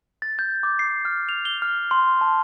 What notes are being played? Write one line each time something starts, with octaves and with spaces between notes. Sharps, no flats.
A6
G6
D6
C7
F6
F7
G7
F6
C6
A5